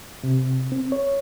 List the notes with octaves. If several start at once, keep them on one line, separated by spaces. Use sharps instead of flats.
C3
C4
C#5